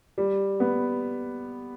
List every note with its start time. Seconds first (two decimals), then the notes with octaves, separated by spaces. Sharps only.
0.18 G3
0.60 B3